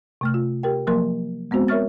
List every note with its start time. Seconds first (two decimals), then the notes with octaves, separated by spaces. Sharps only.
0.21 C3 A3 F6
0.34 F4
0.63 G4 A#4 G5
0.87 F3 F#3 A#3 A#4 C6
1.51 G#3 B3 C4 F#4 C5
1.68 A#4 C#5 E5 C#6 F6 A6